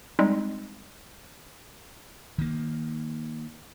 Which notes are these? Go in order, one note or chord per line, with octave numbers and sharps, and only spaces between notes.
G3 G#3 C4 D#4
D#3 A#3